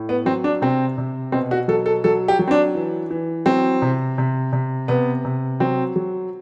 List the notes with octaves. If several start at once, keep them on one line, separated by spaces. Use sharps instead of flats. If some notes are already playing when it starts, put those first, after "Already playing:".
Already playing: A2
B3
F#3 C4
D4
C3 C4
C3
B2 C4
F#4
F#3 A4
A4
F#3 A4
G4
F#3
C4
D4
E3
E3
F#3 C4
C3
C3
C3
C3 B3
C3
F#3 C4
F#3